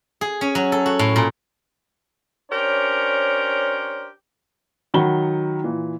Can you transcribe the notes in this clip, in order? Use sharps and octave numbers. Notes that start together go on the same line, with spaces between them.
G#4
C#4
F#3
A4
F#4
A2
A#2
C#4 D4 G4 A#4 C5 C#5
D#3 F#3 F#5 B5 G7
A#2 E3